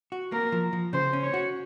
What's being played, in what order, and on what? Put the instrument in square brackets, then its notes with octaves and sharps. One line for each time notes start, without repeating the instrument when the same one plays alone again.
[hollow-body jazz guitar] F#4
[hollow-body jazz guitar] A#3 [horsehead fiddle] A#4
[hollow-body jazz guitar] F3
F3
[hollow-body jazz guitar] C#3 [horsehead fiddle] C5
[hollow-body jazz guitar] C#4
[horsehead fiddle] C#5
[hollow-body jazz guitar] F#4